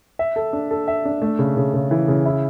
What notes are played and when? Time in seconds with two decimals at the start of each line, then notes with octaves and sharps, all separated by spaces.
0.19 E5
0.36 A4
0.53 D4
0.71 A4
0.88 E5
1.05 D4
1.22 A3
1.39 C#3
1.57 C#3
1.74 C#3
1.91 E3
2.08 C#3
2.26 E4